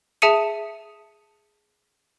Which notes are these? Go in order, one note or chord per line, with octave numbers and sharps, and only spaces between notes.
G#4 E5 A5 D#6 C#7 D#7